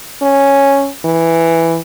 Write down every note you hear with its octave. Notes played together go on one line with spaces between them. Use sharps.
C#4
E3